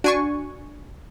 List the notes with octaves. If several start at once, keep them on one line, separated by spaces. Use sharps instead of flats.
D4 F#4 G#5 C#6